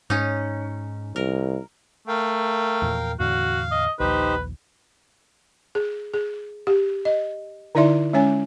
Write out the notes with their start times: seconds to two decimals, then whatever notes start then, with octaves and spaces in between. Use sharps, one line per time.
0.10 G#2 C#4 D#4
1.16 C2 A#4
2.08 A3 A#4 F5 G5
2.82 E2 A#2 F3
3.20 E2 A2 D3 F#4 F5
3.72 D#5
4.00 A#1 D#2 F3 D#4 G4 B4 C5
5.75 G#4
6.14 G#4
6.67 G4
7.05 D#5
7.75 D3 D#4 E4 D5 E5 C6
8.13 G#3 C#4 C#5 G#5